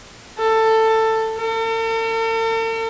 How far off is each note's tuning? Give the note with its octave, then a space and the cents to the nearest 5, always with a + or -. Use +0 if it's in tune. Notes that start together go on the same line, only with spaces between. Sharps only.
A4 +15
A4 +45